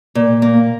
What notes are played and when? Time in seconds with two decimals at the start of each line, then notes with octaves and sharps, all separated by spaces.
0.15 A#2
0.42 A#3